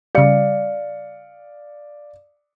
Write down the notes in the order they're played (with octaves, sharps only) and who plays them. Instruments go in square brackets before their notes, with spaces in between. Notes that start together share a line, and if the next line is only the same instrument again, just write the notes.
[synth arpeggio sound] C#3 G3 [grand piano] D5 F5 C#7